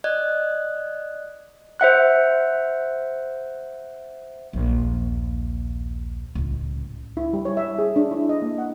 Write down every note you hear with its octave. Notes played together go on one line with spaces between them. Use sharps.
D5 D#5 F#6 G#6
C5 E5 F#5 F#6
A#1 D#2
C#2 A2
E4
G3
C#5
E5
G#4
D4
E4
D#5
A#3
F#5